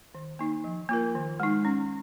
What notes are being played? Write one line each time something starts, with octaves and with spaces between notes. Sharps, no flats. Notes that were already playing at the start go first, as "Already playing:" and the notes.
D#3
A#3 D#4
F3
A#3 F4 A#4
D#3
G#3 D#4
C#4